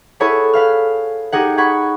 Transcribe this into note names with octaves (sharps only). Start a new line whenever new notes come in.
E4 G#4 A4 C#5 F#5 B5
B4 F5 F6
D#4 G4 G#4 F#5
F#5 B5 C#6 G#6